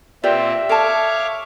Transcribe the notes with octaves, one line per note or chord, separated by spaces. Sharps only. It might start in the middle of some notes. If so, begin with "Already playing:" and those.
A#2 C4 F4 G4 B4 D5 E5
A4 C#5 F5 A5 D6